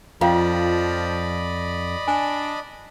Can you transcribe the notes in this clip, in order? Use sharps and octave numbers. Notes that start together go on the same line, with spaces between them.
F2 F3 F4 D5 D#5 F5 G5 B5
D4 G#5